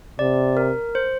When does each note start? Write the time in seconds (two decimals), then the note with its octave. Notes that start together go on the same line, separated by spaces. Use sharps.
0.19 C3 D5
0.57 A#4
0.95 C5